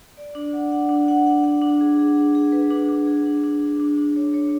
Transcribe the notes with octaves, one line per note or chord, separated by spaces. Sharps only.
D5
D4
F#5
F#5
D4
F#5
F#5
F#5
D4
G#4
G#4
G#4
G#4
B4
D4
D4
G#4
D4
D4
D4
D4
D4
C#5
C#5